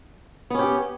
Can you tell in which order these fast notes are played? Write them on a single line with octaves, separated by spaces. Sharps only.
B3 C#4 G4